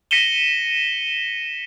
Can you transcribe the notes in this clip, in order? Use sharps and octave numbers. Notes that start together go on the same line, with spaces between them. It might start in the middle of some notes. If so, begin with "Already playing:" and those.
A#6 B6 C#7 D#7 E7 G7